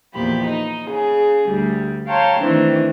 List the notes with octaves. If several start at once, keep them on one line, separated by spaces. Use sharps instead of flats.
E2 A#2 F3 G4 B5
D#4
C#3 G#4
D2 G3
C#5 F5 G5 A5 A#5 C6
D#3 E3 A3 C4 D4